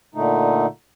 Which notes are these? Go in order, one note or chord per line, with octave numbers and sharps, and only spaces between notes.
A#2 D3 A3 D#4